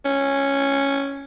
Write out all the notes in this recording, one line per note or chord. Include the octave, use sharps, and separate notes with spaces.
C#4